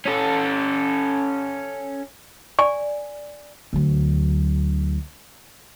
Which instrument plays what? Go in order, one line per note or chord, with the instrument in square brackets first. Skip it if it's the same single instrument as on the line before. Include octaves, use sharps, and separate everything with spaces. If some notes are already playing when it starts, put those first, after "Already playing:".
[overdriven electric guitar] C#4 A4
[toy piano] D5 G#5 [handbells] C#6
[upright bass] D2 F#3